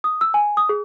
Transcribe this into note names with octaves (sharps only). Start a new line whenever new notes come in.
D#6
E6
G#5
D#6
G#4